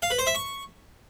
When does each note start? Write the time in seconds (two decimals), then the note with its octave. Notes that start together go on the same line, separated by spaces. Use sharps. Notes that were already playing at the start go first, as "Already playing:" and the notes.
0.02 F5
0.10 B4
0.19 C5
0.27 E5
0.35 C#6